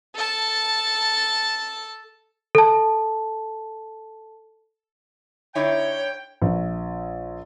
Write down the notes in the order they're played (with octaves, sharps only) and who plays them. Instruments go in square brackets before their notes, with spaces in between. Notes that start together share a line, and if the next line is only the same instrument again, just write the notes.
[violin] A4 A5
[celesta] A4 A5
[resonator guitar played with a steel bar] D3 D#4 E4 [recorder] C#5 [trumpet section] G5
[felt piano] A#1